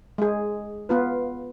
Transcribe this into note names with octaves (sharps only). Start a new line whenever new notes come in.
G#3 G#4
B3 F4 B4